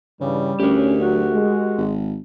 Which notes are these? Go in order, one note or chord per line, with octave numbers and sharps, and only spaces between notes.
G2 C#3 E3 G3
D2 C#4 G4 A#4
F#3 F#4
G#3
G#1